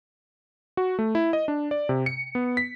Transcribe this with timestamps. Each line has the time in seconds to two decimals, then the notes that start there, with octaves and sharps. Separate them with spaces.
0.77 F#4
0.99 A3
1.15 E4
1.33 D#5
1.48 D4
1.71 D5
1.89 C3
2.06 C#7
2.35 B3
2.57 B6